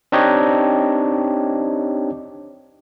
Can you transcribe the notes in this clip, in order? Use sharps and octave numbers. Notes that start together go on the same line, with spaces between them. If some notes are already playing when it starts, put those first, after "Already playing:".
C4 D4 D#4 G4 C#5 D#5